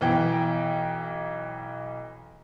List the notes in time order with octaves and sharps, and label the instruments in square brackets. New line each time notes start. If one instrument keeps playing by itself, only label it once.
[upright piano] B1 E3 G5